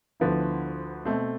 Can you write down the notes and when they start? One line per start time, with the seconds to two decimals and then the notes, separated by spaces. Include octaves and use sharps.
0.20 D2 D3 F3 B3 E4
1.05 B2 A3 C4